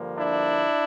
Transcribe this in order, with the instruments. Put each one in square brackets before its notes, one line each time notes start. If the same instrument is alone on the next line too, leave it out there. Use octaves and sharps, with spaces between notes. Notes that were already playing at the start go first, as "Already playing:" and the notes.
Already playing: [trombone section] G2 D3 F3 A#3
D4 E4